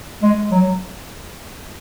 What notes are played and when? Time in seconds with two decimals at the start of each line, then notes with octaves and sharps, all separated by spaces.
0.23 G#3
0.51 F#3